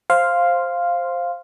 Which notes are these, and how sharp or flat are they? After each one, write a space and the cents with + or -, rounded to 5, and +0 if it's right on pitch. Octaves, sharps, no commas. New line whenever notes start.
C5 +10 F5 +0 C6 +0